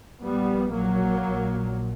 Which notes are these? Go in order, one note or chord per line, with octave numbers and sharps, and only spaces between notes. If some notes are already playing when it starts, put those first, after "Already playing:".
A#1 A#2 G3 B3
F#3 A#3
A#1 A#2